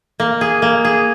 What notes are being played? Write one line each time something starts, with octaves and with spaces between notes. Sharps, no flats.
A#3
G#4
A#3
G#4